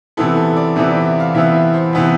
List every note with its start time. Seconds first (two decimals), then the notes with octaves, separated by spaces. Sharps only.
0.17 C3 E3 B3 E4 A4
0.37 A4
0.56 D5
0.76 C3 E3 B3 E4 E5
0.91 D5
1.05 E5
1.20 F5
1.34 C3 E3 B3 E4 E5
1.54 E5
1.74 C5
1.93 C3 E3 B3 E4